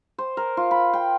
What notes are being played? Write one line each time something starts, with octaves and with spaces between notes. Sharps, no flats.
C5
A#4
F4
B5
G5